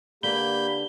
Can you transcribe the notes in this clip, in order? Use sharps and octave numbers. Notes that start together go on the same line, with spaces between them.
D3 A#3 D4 G4 B4 B5 G6 G7